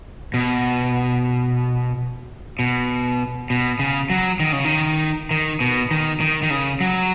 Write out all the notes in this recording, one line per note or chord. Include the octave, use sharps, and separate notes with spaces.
B2
B2
B2
C#3
F#3
D#3
C#3
D#3
D#3
B2
D#3
D#3
D#3
C#3
F#3